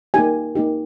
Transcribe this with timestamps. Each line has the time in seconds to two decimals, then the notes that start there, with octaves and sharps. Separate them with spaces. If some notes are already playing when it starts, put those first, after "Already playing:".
0.14 A#3 D#4 G4 G#5
0.55 A#3 D#4 G4